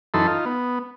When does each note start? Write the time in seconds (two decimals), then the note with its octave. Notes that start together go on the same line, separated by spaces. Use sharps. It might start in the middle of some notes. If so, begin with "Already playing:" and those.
0.14 F#2 E3 D#4 A4 B5 C6
0.27 D#4 F4
0.46 B3